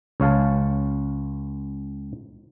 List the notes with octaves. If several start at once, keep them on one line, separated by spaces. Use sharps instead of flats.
C#2 C#5 F5 A5